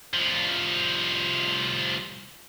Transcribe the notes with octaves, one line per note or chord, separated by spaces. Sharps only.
C2 F3